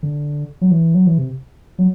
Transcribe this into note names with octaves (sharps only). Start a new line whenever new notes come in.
D3
F#3
E3
F#3
E3
C3
F#3